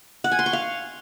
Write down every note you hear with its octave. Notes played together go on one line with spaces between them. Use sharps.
F#5
G#5
C6
C#6
F5